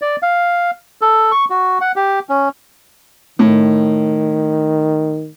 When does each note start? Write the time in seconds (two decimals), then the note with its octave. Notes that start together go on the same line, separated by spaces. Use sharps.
0.02 D5
0.23 F5
1.01 A4
1.32 C#6
1.50 F#4
1.81 F#5
1.96 G4
2.29 C#4
3.39 A2 D#3